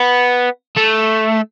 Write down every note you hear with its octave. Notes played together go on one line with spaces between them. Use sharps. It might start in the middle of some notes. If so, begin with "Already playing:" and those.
Already playing: B3
A3